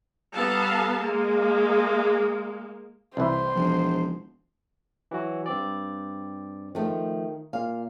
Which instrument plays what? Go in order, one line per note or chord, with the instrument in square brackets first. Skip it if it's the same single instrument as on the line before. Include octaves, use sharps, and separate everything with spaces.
[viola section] G3 B3 A4 F5 A5 A#5
G#3 A#3
[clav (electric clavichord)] C2 E3 [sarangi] C5 [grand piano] E5 B5
[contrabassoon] E1 [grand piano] F3
[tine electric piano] E3 F#3 F#4
G2 C4 D5
[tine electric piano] D#3 [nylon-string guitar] F3 A3
[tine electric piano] A#2 [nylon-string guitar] F5